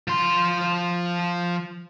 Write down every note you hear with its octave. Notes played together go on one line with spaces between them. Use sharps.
F3 C6